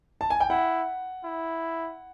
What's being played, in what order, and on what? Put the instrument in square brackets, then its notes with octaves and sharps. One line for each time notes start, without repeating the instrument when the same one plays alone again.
[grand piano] A5
G#5
G5
[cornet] E4 [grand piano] F#5
[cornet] E4